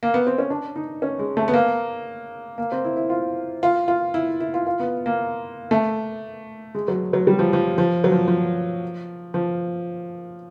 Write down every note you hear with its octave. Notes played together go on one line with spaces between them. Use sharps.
A#3
B3
C4
C#4
D4
D#4
C#4
G#3
A3
B3
A#3
A#3
C4
E4
E4
F4
F4
F4
E4
E4
F4
F4
B3
A#3
A3
G#3
F#3
F#3
G3
F3
F3
F3
F#3
F3
F3
F3